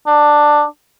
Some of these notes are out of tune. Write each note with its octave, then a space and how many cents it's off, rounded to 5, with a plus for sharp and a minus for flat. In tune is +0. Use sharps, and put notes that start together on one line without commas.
D4 +10